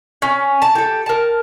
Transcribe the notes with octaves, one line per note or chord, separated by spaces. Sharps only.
C#4
A5
G4 A4
A#4 A5